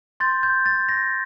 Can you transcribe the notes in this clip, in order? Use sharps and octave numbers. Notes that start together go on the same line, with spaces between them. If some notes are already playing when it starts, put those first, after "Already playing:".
C6 G6 A6
G6
A6
A#6